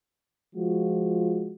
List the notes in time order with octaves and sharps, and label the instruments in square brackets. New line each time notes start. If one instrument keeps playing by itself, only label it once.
[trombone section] F3 G#3 F4 F#4